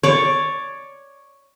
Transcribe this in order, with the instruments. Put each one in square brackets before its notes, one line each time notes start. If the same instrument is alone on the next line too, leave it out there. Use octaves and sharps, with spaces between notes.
[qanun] C#5 D5